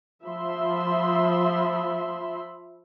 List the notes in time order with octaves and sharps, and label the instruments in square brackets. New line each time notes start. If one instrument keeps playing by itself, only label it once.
[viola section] F3 E5 B5 C6